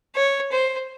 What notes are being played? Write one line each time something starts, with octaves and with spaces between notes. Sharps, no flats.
C#5
C5